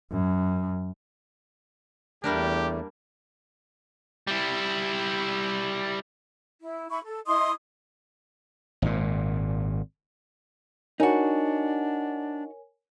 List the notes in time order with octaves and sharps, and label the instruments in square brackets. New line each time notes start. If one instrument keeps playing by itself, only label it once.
[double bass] F#2
[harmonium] E2 A3 [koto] G3 A#3 D4 [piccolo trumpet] G4
[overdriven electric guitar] G3 E4
[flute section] E4
E4 B5 C#6
A4
E4 D#5 C6 D#6
[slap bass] G#1 A#2
[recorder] D4 [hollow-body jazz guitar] D#4 F#4 [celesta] A#4 C#5 G#5